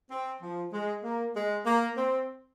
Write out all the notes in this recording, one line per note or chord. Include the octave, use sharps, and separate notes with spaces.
C4
F3
G#3
A#3
G#3
A#3
C4